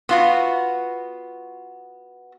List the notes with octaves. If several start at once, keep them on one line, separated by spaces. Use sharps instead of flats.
B3 F4 F#4